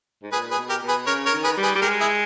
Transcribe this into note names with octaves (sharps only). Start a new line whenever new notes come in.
G#2
A#2 G#4 B4
G#4 B4
B2
G4 A#4
B2
G#4 B4
C#3 A#4 C#5
A#4 C#5
D#3
G#4 B4
G3
G#4 B4
G3
G#3 G4 A#4
E4 G#4